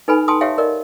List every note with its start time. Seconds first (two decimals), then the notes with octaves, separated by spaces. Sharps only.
0.08 D#4 A4 B4 G#5 B5
0.28 G5 A5 C6 D#6
0.41 G4 C#5 E5 F5 G5
0.58 A#4 D5 D#5